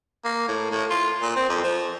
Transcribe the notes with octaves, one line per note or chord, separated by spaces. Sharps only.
A#3
A2
A2
F4
A#2
C4
F2
F3